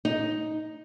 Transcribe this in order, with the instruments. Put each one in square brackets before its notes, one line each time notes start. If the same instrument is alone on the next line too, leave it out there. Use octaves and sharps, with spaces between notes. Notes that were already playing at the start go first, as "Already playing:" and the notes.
[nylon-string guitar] D#4